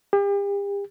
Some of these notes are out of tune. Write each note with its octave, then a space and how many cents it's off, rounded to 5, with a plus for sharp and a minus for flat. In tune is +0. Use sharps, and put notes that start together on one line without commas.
G4 +40